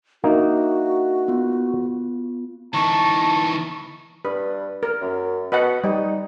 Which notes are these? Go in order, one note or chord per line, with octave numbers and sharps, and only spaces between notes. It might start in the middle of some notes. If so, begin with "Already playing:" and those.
A#3 D4 D#4 F#4 E5
B3 F4
E3 D#4 A5 C#6
G2 B4
A#4
F#2
B2 B4 D#5 F#5
G3 D#4